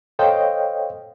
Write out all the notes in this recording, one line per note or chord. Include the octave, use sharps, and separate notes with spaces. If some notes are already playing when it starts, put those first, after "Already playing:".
A4 C5 C#5 D#5 F5 G5